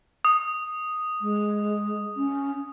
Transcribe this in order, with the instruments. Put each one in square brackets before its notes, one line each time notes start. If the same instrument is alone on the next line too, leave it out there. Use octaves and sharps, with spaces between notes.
[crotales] D#6
[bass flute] G#3
C#4